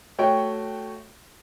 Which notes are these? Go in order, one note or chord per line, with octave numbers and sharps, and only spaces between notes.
A3 F#4 C#5 G5